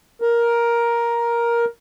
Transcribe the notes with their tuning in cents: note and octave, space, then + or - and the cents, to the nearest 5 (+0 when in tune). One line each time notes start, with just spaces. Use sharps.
A#4 +10